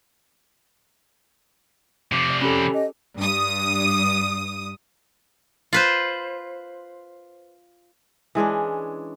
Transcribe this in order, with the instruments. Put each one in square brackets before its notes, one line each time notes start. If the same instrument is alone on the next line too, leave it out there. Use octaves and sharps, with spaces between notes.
[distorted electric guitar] C3 F3 [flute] D6
[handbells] D5
[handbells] C#4 G4 A4 [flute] B5
[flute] D#5
[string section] G2 D#6
[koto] F4 B4 C5
[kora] E3 G#3 C#4 D4